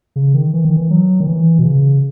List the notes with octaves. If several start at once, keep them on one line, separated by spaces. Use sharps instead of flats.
C#3
D#3
E3
D#3
E3
F#3
D#3
E3
B2
C#3